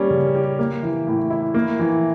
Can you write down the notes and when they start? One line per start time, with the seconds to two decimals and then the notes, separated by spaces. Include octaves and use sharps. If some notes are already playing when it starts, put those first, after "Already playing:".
Already playing: G3 A#3 C#4
0.10 C#3
0.35 G4
0.59 A#3
0.83 E3
1.07 A2
1.30 E4
1.54 A#3
1.79 E3